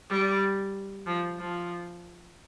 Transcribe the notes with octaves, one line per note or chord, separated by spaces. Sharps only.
G3
F3
F3